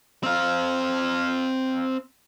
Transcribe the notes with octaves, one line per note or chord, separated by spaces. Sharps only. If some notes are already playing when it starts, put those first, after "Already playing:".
C4 F5